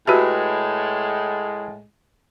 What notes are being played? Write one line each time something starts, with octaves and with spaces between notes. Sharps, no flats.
A2 G#3 F#4 G4 B4 E5 A5